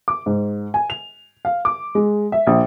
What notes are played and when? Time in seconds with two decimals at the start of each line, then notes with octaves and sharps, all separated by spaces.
0.08 D6
0.26 G#2
0.74 G#5
0.90 F7
1.45 F5
1.65 D6
1.95 G#3
2.32 E5
2.47 A#1